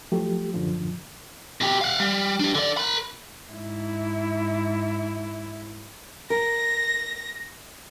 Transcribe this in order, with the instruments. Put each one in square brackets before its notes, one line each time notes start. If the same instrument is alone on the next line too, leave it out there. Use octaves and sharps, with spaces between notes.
[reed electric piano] F3 F#3 A3 G4
F#2 A2 D3 F3
[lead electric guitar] B2 G4
F5 F#5
G3
D4 G4
D3 D5
A#4 B5
[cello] G#2 E4
[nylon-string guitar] A#4 [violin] A#6